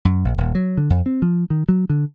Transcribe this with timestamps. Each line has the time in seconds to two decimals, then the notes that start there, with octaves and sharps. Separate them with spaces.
0.05 F#2
0.25 A#1
0.38 D#1
0.55 F#3
0.77 D3
0.90 F2
1.06 C4
1.22 F3
1.50 D#3
1.69 F#3
1.90 D3